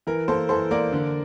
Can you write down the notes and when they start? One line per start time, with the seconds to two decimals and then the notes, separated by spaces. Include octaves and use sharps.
0.07 E3 A#4
0.28 A#3 A4 C5
0.49 E3 A4 C5
0.71 A#3 A#4 D5
0.93 D3